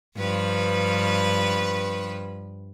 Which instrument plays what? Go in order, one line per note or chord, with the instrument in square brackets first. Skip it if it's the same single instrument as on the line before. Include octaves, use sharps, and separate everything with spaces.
[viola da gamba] G2 F3 B4